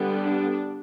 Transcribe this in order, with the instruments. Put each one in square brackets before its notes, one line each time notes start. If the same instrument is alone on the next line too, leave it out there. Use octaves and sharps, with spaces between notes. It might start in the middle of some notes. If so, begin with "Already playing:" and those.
Already playing: [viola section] D3 G3 B3
D4